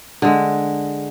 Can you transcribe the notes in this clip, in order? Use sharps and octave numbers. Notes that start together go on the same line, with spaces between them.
D3 G#3